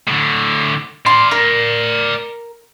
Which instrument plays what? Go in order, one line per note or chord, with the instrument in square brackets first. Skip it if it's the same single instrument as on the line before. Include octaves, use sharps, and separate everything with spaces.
[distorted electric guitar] A2 D3
[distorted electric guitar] D5 F5 [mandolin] C6
[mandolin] A#4